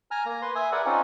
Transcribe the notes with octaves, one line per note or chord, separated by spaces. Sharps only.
G#5 A#5 F6
A#3 A#5
B4 C6
E5 G#5 D#6
G#4 A#4 B4 D5 E5 F#5
C4 C#4 D#4 F4